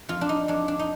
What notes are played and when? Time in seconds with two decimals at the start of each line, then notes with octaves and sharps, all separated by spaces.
0.09 F2 F4
0.21 D4
0.29 D#4
0.48 F2 D4
0.68 D4
0.79 D#4